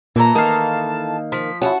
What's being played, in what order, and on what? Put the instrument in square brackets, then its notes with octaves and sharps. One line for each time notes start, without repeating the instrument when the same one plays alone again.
[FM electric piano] A#2 [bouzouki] E3 A4 A#5
[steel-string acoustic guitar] D#3 A#3 [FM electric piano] D#5 F5 [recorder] A5
[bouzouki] F3 [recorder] B6
[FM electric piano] C#4 E4 [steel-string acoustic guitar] F#4 E5 F#5 [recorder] A5